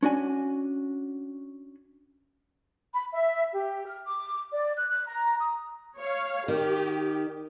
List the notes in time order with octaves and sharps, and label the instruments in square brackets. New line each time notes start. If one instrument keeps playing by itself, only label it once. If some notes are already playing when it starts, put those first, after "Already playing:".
[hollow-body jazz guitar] C#4 D4 F#4 G#5
[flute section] B5
E5
G4
F6
D6
D5
F#6
F#6
A#5
D#6
[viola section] C#5 F5
[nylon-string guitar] D#3 [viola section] G4